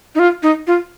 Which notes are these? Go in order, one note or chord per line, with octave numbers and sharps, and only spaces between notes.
D#4
F4
D#4
F4